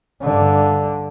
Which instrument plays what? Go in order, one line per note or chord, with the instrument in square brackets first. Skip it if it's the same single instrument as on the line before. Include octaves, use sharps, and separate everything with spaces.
[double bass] G2 D3